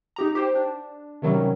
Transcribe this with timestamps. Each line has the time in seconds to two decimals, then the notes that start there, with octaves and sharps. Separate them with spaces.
0.16 D#4 G4 A#5
0.35 G4 C5 G5
0.55 D4
1.22 C3 D#3 F#3 G3 C#4